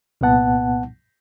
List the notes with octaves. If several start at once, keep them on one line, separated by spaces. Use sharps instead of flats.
C2 A#2 B3 F#5 A5